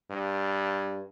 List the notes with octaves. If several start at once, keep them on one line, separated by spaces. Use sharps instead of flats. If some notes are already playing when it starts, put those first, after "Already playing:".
G2